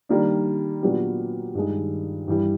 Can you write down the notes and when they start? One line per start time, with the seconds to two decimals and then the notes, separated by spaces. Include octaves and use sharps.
0.09 D#3 G3 A#3 D4
0.82 A#2 F#3 B3 D4 G4
1.55 G2 D#3 G#3
2.28 G2 E3 G3